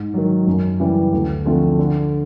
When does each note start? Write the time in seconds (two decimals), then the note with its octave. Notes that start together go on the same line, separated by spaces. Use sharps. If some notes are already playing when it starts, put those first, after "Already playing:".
Already playing: G#2
0.14 D#3 F#3
0.47 F#2
0.80 C#3 E3 G3
1.13 D2
1.45 D3 F3 A3 C4
1.79 D3